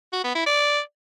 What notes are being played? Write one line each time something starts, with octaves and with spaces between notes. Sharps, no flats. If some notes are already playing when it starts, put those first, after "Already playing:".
F#4
B3
E4
D5